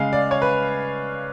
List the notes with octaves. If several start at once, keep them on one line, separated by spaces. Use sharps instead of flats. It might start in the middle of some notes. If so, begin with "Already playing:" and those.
Already playing: C#3 G#3 F5
D5
C#5
B4